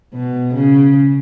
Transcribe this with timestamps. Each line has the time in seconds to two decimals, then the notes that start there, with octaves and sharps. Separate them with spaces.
0.14 B2
0.54 C#3